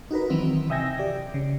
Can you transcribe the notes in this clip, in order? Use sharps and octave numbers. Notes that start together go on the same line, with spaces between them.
D#4 F#4 A#4 B4
D#3 E3 F#3 C4 E4
C3 D#5 E5 G5 G#5 A#6
G4 D5
C#3